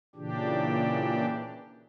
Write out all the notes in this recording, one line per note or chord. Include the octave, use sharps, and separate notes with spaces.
A#2 C#3 E3 D4 G4